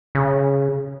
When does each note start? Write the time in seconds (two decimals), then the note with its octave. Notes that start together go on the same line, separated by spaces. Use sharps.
0.15 C#3